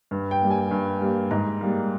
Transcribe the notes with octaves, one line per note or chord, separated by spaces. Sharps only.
G2
G5
G3 A#3
G#5
G2
G3 A#3
G#2 A#5
G3 A#3